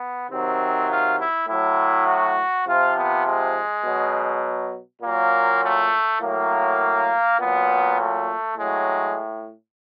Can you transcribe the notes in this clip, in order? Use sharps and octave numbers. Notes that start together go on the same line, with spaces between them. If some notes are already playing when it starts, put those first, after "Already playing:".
Already playing: B3
C3 D#3 F#3 C4
F4
E4
A2 F#3 E4
F#4
C3 F3 F4
B3
G#3
B2 F#3
A#2 F#3 A#3
A3
A2 F#3 A#3
A#2 F#3 B3
A3
A2 F#3 G#3